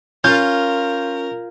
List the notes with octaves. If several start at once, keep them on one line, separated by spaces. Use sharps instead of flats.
C#4 F4 A#4 G6